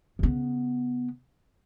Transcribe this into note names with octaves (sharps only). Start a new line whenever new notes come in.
C#3 B3